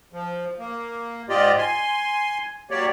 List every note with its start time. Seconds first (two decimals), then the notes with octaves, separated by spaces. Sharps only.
0.13 F3
0.59 A#3
1.29 G#2 F4 G4 D5 D#5
1.58 G#5 C6
2.71 F#3 A#3 G4 C#5 D5